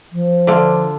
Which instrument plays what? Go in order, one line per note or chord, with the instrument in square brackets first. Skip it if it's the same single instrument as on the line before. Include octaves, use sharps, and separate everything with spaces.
[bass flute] F3
[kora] D3 D4 F4